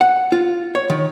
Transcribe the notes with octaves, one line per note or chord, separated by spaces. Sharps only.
F#5
F4
C#5
D#3